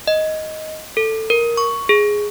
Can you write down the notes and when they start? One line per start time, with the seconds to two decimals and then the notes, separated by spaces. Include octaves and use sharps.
0.07 D#5
0.97 A4
1.30 A#4
1.57 C#6
1.89 G#4